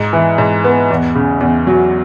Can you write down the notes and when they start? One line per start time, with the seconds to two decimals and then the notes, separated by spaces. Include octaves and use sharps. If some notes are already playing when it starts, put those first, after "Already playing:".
Already playing: G#2
0.13 E3
0.38 G#2
0.64 B3
0.90 E2
1.15 C#3
1.41 E2
1.67 F#3